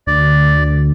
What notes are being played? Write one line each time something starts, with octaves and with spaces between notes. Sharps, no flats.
D2 D5